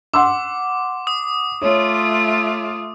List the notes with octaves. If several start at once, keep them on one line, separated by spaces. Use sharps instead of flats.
F#5 C6 D6 E6
D#6
A3 F4 C#5